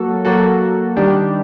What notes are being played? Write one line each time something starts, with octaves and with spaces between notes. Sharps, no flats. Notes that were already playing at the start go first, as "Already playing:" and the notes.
Already playing: F#3 A#3 F#4 A4
F#3 A#3 F#4 A4
D#3 G3 D4 G4